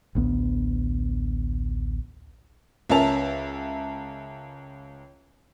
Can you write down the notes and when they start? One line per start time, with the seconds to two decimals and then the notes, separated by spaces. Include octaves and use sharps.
0.15 A1 D2 B3
2.90 C#2 C#4 A#4 E5 A5 F7